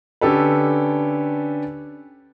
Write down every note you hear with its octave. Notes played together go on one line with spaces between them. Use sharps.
D3 C#4 G4 A4 B4